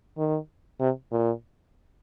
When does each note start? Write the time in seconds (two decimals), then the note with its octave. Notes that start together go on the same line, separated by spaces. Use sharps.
0.18 D#3
0.80 C3
1.12 A#2